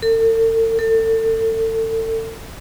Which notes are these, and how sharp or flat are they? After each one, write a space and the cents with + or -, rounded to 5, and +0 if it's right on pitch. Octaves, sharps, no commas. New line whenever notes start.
A4 +45
A4 +30